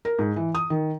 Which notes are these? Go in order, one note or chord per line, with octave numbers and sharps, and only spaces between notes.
A#4
G#2
E3
D#6
D#3